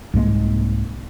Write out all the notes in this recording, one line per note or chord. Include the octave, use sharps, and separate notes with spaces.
C2 G#2 G#3 A#3